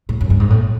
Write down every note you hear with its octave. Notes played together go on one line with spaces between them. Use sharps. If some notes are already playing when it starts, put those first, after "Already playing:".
A2
F#2
G2
G#2
A2